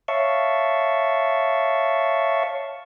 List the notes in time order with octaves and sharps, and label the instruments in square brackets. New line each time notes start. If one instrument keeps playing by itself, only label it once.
[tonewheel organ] C#5 E5 F5 A5 C#6